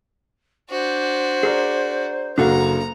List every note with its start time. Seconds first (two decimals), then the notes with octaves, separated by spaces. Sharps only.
0.70 D4 F#4 C5
1.43 G#4 A#4 D5
2.38 F#1 D4 F#4 A4 F5 A#5